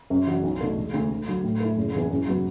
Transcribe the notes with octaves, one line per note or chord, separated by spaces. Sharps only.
F#2
E3 D4 F#4
B1
B2 A3 D4
E1
D2 D3
D2
D3 F#3
A2
A3 E4
F#1
E2 E3 B3
F#2
F#3 B3